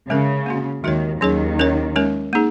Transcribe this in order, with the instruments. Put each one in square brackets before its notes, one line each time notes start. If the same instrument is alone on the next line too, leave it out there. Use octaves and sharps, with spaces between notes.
[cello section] C#3 [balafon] G#3 C#4 A#4
[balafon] A#3 C#4 F#4
[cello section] D#2 D#3 [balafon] G#3 F#4 A#4 C#5
[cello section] D#2 D#3 [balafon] F#3 C#4 G#4 C#5
[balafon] C#4 A#4 C#5
G#3 C#4 A#4 C#5
A#3 D#4 G#4